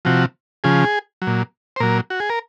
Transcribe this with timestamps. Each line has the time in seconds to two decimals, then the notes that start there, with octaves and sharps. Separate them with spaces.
0.05 C3 F3 F#4
0.64 C#3 F3 G#4
1.22 F#3
1.27 A#2
1.76 C5
1.80 A#2 F#3 A#4
2.10 F#4
2.20 G#4
2.30 A#4